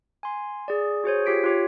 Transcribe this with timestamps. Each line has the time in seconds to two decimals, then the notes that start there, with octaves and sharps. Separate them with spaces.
0.23 G#5 C6
0.68 G#4 D5
1.04 F#4 G#4 C5 C#5
1.26 F4 G4 B6 D7
1.44 F4 G4 C#5